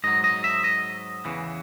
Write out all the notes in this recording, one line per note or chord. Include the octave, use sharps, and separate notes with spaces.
G#2 F#3 D#5
D#5
E5
D#5
E2 C#3 E3